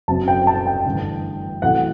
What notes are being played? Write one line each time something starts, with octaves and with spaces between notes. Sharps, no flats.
F#1 F#2 F#3 C4 A5
G5
A5
G5
A1 G2 D3
A1 A2 F#3 A3 C4 F#5